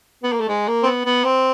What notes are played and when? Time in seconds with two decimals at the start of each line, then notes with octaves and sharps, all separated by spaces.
0.23 B3
0.32 A#3
0.40 A3
0.48 G#3
0.68 A#3
0.83 C4
0.86 B3
1.06 B3
1.25 C4